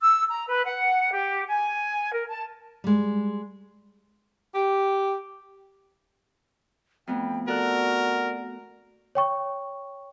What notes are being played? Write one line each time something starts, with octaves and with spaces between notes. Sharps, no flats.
E6
A#5
B4
F#5
G4
G#5
A#4
A5
G3 G#3
G4
F2 A3 B3 G5
F#4 A4 A#4 D5 F#6
C#5 G5 C#6